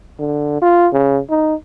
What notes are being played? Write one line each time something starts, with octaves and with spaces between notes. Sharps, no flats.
D3
F4
C#3
D#4